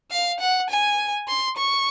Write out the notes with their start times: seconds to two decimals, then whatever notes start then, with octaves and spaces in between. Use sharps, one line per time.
0.11 F5
0.40 F#5
0.70 G#5
1.28 C6
1.57 C#6